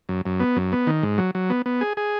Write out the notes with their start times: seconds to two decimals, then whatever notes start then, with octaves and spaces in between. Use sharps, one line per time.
0.09 F#2
0.25 F#2
0.40 B3
0.56 F#2
0.72 B3
0.87 D#3
1.03 G#2
1.18 F#3
1.35 F#3
1.50 B3
1.66 B3
1.81 G#4
1.97 G#4